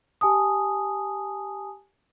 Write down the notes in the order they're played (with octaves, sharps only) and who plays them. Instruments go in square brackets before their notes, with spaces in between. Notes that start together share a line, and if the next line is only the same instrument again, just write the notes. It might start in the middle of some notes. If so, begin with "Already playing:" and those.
[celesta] G4 G#5 A5 D#6